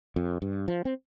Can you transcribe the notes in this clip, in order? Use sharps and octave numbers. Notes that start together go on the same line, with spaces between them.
F2
G2
F3
C4